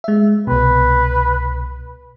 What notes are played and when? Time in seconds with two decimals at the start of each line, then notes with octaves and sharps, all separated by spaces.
0.04 G#3 E5
0.47 C2 B2 B4